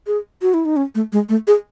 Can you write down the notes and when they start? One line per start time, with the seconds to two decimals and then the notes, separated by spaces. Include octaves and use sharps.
0.07 G#4
0.42 F#4
0.54 E4
0.65 D#4
0.76 C#4
0.95 A3
1.13 G#3
1.29 A3
1.47 G#4